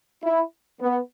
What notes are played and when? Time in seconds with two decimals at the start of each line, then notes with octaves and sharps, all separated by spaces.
0.24 E4
0.81 B3